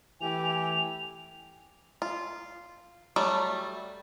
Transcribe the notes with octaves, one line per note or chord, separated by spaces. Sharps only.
E3 A3 G4 G#5 F7
F4
F#3 G3 A3